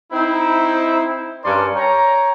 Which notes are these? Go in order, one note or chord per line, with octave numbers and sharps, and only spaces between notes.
C4 D#4 E4
G2 C#4 A#4 D5 A5 C6
C#5 G5 A#5